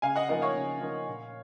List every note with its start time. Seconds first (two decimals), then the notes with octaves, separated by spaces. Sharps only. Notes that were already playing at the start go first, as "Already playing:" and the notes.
0.02 C#3 F5 G#5
0.16 D#5 F#5
0.29 F3 A#3 D#4 D#5 F#5
0.42 C#5 F5
0.55 C#3
0.81 F3 A#3 D#4
1.07 A#2